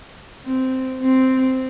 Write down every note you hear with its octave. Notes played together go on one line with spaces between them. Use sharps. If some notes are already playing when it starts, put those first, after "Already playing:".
C4
C4